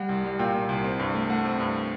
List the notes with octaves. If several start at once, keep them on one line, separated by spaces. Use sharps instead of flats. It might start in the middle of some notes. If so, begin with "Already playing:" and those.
Already playing: G3 F#5
C2
G3
A#2 G5
A#2
C2
C4
G2
A3
A3 F#5
C4
G2